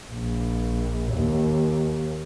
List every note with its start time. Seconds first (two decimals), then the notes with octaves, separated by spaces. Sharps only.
0.11 A#1
1.13 D#2